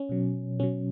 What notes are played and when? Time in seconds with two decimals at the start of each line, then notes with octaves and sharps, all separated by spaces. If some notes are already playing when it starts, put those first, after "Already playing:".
Already playing: C#4
0.09 B2 F#3
0.60 B2 F#3 C#4